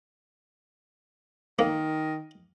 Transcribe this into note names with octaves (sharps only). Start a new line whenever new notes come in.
D#3 A#3